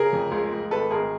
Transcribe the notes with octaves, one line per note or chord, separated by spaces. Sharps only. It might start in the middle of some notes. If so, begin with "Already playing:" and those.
Already playing: C#3 G#4 A#4
F2
C#2
C#2
G#1 A4 B4
G#1 G#4 A#4